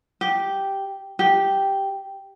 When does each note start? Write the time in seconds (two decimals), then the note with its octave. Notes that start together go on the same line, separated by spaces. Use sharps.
0.21 G4
1.19 G4